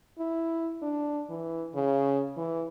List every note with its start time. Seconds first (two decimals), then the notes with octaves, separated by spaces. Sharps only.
0.19 E4
0.82 D4
1.29 E3
1.75 C#3
2.37 E3